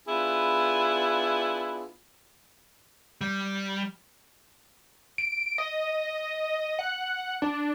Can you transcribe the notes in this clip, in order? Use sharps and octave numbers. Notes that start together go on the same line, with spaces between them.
B3 D4 E4 F4 G#4
G3
D7
D#5
F#5
D4